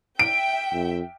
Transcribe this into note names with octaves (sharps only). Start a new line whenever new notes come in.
E5 G5 D7
F2